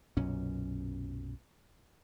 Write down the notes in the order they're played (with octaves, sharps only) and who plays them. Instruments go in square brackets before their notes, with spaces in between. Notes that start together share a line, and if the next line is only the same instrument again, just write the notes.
[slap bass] B1 F#2 A#2 C#4